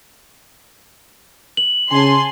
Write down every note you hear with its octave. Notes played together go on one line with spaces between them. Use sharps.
F#7
C#3 G#5 A5 C6